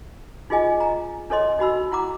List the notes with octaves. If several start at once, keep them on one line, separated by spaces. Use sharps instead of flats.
D#4 F4 G#4 D#5 G#5
A#5
D4 A4 C#5 D#5 C6
D#4 F#4 B5 E6
E4 F#5 A#5 D6